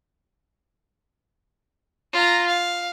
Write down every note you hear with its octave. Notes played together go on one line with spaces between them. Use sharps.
F4 A#5
F5